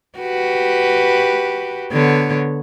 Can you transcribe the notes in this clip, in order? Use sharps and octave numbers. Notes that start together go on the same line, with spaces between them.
F#4 G4 B4
D3 B3 C#5